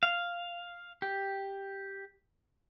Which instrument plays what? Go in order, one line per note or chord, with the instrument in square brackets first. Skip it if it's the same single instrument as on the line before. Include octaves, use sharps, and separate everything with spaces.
[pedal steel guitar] F5
G4